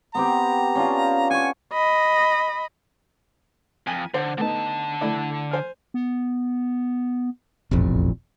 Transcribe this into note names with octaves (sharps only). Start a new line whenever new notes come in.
B3 C4 G4 A#5
C#4 D4 F4
F#5 G#5 C#6
D#5 B5
F2 G#5
D3 C5
D3 A3 B3 D#4 A5
A3 E4 D5
C5 G#5 F6
B3
E1 A1 F2 A#2